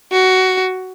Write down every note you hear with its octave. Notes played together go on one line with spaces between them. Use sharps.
F#4